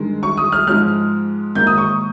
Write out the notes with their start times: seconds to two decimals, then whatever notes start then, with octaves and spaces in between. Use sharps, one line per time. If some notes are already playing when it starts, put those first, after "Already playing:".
Already playing: G2 D#3 G#3
0.23 C#6
0.37 D#6
0.52 F6
0.67 G#2 F3 G#3 F6
1.55 G#2 D#3 A#3 G6
1.67 D#6
1.78 C#6